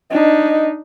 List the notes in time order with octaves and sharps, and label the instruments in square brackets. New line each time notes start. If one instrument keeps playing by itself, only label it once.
[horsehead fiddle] D4 D#4 [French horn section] D#5